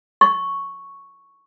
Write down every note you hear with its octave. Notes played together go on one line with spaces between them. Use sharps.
C#6